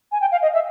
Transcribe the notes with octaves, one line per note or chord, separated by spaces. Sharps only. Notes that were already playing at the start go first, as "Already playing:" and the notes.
G#5
G5
F5
D#5
E5